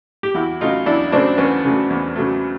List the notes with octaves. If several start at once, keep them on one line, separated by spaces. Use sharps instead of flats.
G4
E2 E4 F#4
C#3 F#3 A3 D#4 F4
E2 D4 E4
C#3 F#3 A3 C4 D4
E2 B3 C#4
C#3 F#3 A3
E2
C#3 F#3 A3